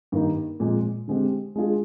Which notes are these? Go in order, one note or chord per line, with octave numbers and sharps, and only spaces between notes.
G2 D#3 G3 A#3 D#4
A#2 F3 G#3 C4
D3 G#3 C4 G4
G#3 D4 F4 G#4